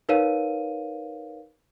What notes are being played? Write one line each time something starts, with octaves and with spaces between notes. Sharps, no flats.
D#4 A#4 B4 C#5 F5 D#7